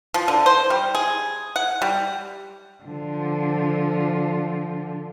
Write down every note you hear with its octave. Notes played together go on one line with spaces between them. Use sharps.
F3
D3
C5
G3
G#4
F#5
G3
D3 F3